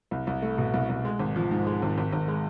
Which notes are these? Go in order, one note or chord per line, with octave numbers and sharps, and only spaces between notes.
C2
C2
A3
B2
C2
C2
G#3
G#1
F3
G#2
G#3
G#1
G#1
G#1
G#3